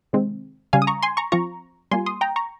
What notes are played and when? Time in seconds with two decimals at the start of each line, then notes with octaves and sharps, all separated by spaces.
0.13 C3 D#3 G#3 C4
0.73 C#3 G3 C#4 F5 G#5
0.82 D#6
0.87 A#5 C#6
1.03 G#5 C6
1.17 A#5 C#6
1.32 F3 C4 F4 A#5 C#6
1.91 G3 A#3 F4 G#5 C6
2.06 C6 D#6
2.21 G5 A#5
2.36 A#5 C#6